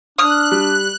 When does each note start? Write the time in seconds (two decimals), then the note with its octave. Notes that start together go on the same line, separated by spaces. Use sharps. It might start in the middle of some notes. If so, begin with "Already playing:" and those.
0.18 D4 D#6 F6 F#6
0.52 G3